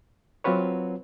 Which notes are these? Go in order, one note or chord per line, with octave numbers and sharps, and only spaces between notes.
F#3 C4 F4 F#4 B4 C#5